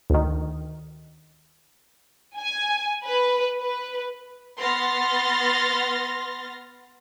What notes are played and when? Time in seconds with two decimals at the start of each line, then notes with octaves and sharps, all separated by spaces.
0.10 D2 D#3
2.40 G#5
3.05 B4
3.60 B4
4.59 B3 C6 F6 A6 A#6